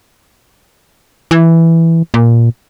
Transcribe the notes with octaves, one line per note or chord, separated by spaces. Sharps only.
E3
A#2